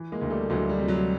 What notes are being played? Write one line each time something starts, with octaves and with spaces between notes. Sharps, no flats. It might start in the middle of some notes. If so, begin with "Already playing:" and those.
Already playing: E3
G#3 A#3
D2
G3 A3
D2 F#3 G#3
G3
C3
F#3